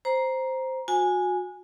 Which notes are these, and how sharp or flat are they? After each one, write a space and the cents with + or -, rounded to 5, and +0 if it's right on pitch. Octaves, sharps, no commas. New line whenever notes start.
C5 +0 A#5 +15
F#4 -30 G#5 +0